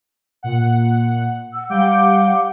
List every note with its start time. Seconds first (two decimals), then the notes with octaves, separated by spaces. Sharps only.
0.43 A#2 F#5
1.54 F#5 E6
1.70 G3 F5 F#5 D6 G6 D7